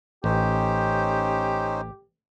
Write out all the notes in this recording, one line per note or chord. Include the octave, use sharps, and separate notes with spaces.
A1 C#4 D#4 G4 C5